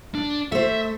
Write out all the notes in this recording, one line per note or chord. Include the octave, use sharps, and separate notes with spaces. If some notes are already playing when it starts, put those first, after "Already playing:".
D4
A3 C5 E5